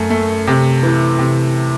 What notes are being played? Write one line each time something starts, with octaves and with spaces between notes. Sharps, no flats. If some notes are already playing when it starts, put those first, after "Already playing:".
Already playing: F#2 A3
A3
C3
E3
C3